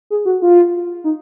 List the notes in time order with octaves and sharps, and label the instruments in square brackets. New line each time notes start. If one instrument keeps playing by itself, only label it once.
[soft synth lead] G#4
F#4
F4
D#4